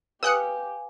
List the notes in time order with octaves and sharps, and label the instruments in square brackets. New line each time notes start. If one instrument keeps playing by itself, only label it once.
[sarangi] G4 [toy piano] B4 [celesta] F5 G#5 [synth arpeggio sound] D#6 F#6 C#7